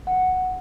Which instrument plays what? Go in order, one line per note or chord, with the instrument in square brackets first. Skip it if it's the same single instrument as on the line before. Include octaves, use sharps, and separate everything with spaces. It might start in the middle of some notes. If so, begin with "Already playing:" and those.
[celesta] F#5